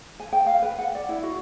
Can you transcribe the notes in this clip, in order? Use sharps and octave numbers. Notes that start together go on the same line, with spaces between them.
G#5
G5
F5
B4
F#5
D5
E4
F#4